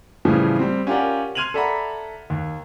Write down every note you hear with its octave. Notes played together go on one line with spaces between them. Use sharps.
A2 C#3 E3 F3 G3
G3 C4
C#4 F4 G4 A#4 D5 F#5
C6 F6 G#6 D#7 F7 F#7
A4 D5 E5 F#5 A#5 B5
D#2